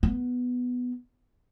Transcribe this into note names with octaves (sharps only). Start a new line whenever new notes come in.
B3